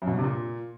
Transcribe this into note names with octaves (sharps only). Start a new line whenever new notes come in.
F#2
B2
G2
C3
A#2